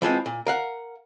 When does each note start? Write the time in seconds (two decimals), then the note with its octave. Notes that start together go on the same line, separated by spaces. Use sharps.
0.02 E3 F3 G#3 C4
0.26 A#2
0.46 A#4 F5 F#5